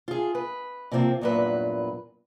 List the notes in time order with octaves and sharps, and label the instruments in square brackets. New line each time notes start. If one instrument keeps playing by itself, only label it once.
[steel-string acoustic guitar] F4 G#4
B4
C3 F3 A#3 C4 F4
E2 G2 A#2 F#3 B4